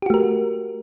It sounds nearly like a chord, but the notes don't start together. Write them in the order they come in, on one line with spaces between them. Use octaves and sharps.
G4 F#4 A3 A#4